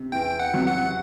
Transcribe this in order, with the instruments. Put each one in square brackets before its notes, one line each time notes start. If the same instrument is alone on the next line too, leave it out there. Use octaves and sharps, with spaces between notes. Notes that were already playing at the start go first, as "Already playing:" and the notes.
Already playing: [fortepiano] C3
[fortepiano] E2 [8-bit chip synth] G5
[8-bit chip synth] F#5
[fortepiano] C3 F#3
[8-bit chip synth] F#5